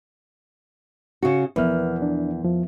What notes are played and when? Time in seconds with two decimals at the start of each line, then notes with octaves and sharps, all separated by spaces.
1.23 C#3 F#4
1.56 E2 F3 B3 A#4 B4 F6
2.02 D4
2.43 F2 F3